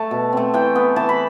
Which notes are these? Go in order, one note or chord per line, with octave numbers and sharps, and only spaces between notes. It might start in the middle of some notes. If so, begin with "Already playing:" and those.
Already playing: A3 A5
B2
A3 C4
E3 G5
B3
E3 A5
B5